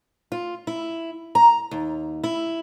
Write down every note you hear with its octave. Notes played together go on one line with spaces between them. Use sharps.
F4
E4
A#5
D#2
E4